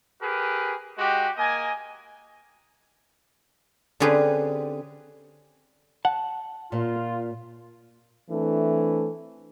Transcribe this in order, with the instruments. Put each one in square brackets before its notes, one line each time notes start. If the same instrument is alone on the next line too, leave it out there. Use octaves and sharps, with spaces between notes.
[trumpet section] G4 G#4 A#4 B4
G#3 F#4 G4
A#3 D#5 G#5
[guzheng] D3 C4 C#4 G4 G#4 B4
[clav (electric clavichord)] F#5 [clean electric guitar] A5
[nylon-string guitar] A#2 [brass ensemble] F4
[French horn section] E3 A3 C4 D4 A4